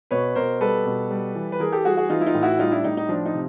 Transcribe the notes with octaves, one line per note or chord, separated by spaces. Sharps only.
B2 B4 C#5
B2 A#4 C5
G3 A4 B4
B2
G3
E3
B4
E3 G#4 A#4
G4 A4
G3 F#4 G#4
F#4 G#4
E3 D#4 F4
E4
D#4 F4
A2
E4 F#4
G3 D#4 F4
D4 E4
A2 D#4
D#4
F3 D4
D#4
C3